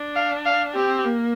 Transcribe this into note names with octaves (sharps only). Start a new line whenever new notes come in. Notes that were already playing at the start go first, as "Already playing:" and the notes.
Already playing: D4
F5
F5
C4 G4
A#3